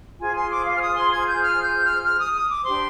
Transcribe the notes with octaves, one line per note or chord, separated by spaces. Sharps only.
F4 G#4 C5 G#5
C6
D6
F5
F6
D#6
C6
G#6
G6
F6
G6
F6
F6
D#6
D#6
D6
D4 G4 C5 C6